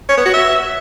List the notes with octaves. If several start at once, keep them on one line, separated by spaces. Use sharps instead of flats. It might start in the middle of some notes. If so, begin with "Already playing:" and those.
C#5
B3
F#4
E5